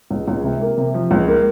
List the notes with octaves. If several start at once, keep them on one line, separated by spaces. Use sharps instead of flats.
C#2
C#2
C3
A#3
C3
F3
C#2
A#3